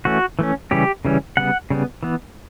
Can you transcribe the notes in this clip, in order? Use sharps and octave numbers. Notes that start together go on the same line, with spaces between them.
E3 A3 C#4 F#4
E3 A3 C#4
C#3 E3 G3 C#4 G4
C#3 E3 G3 C#4
C#3 G3 B3 F#5
C#3 G3 B3
E3 B3